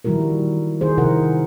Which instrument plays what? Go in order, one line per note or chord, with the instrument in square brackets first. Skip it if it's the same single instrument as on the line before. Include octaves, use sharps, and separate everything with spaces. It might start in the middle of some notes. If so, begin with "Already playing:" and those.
[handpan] D#3 F3 G3 E4 F#4 A#4
D#3 D#4 G#4 C5
C3 F3 E4 A#4 C5 F#5